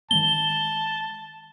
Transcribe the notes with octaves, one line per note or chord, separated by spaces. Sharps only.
D#3 G#3 B3 A5 G7